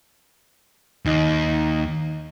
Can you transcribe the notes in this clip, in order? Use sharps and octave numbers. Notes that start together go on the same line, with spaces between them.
D#2 D#4